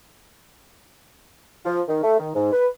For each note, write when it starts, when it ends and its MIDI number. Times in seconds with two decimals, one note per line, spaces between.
1.65 1.82 53
1.88 2.03 51
2.03 2.16 57
2.19 2.30 51
2.35 2.48 44
2.53 2.67 71